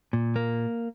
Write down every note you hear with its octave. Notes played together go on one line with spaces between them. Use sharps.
A#2
A#3